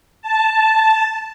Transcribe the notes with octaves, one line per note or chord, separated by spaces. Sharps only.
A5